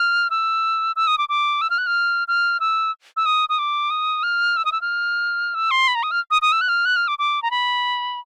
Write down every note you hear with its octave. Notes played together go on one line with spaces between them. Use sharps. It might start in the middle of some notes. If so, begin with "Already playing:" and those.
Already playing: F6
E6
E6
D#6
D6
D6
E6
F6
F#6
F6
F6
E6
E6
D#6
D#6
D6
D#6
F6
E6
D#6
E6
F6
E6
C6
B5
A#5
D#6
F6
D#6
D#6
E6
F#6
F6
F#6
F6
D6
D6
A#5
B5